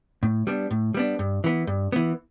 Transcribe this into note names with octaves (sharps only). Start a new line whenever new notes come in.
A2
G3 B3 D4
A2
G3 B3 D4
G2
E3 B3
G2
E3 B3